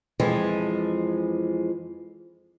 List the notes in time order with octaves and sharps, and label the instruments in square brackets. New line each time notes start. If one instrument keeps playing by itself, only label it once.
[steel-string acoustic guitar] F2 E3 F3 G#3